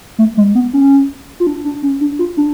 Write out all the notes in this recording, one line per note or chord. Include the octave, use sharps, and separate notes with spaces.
A3
G#3
B3
C#4
F4
D4
D4
C#4
D4
F4
D4